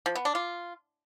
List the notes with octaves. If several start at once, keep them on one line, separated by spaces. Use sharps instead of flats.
F3
B3
D4
F4